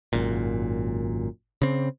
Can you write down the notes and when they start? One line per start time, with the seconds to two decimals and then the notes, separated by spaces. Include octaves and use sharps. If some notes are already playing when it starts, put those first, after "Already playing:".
0.13 G#1 F#2 A#2
1.62 C#3 C4